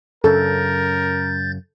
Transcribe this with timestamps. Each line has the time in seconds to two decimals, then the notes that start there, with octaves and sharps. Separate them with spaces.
0.24 F#2 C#3 A4 A#4 G6 A6